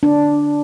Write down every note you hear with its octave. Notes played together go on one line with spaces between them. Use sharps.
D4